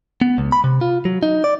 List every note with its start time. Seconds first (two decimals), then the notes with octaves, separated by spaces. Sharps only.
0.21 B3
0.38 C#2
0.52 B5
0.64 C3
0.81 F4
1.05 F#3
1.23 D#4
1.44 D5